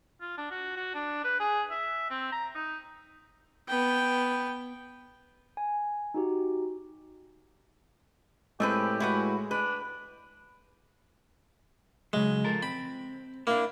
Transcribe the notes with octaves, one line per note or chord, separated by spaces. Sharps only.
F4
D4
F#4
F#4
D4
B4
G#4
E5
C4
A#5
D#4
B3 G5
G#5
D#4 F#4 G4
A2 G#3 A3 C4 G4 B4
E4 F#4 B4
D4 B4
C#3 F#3 G#3
F3 A4 A#4
C4 B5
A#3 D4 E4